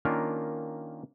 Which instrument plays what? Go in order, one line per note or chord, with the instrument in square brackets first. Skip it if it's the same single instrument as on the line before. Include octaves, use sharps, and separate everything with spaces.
[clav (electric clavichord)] D#3 A#3 C#4 D4 F4 A#4